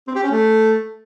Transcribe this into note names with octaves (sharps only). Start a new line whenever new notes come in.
C4
G4
C#4
A3